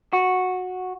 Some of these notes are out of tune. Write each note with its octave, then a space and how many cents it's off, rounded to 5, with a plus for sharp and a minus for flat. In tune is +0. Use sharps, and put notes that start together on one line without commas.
F#4 -10